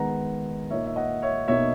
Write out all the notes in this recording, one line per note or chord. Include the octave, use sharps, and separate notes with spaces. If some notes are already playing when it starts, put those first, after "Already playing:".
Already playing: D#3 G#3 B3 F#5 A#5
A#2 A#3 D#4 C#5 E5
E5
D#5 F#5
C#5 E5
B2 A#3 D#4 C#5 E5